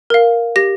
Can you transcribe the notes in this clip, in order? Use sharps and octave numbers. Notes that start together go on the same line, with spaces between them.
A#4 F5
G4 A#6